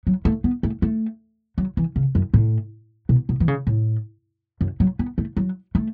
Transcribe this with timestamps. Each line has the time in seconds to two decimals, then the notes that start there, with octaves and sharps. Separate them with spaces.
0.07 F#3
0.25 A3
0.44 B3
0.63 A3
0.82 A3
1.58 F#3
1.77 E3
1.96 C#3
2.15 F#2
2.34 A2
3.09 B2
3.29 B2
3.40 E3
3.48 C#3
3.67 A2
4.61 F#2
4.80 F#3
4.99 B3
5.18 A3
5.37 F#3
5.75 A3